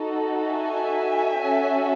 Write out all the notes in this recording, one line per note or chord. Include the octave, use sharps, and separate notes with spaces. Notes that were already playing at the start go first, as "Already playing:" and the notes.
Already playing: D#4 F#4 A4
E5 G#5
C#4 F#4 A4